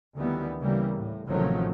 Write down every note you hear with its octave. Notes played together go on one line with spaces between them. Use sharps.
D2 D#3 E3 G3 B3
C#3 E3 G3 A#3
A2
A1 C3 D#3 F3 F#3 A3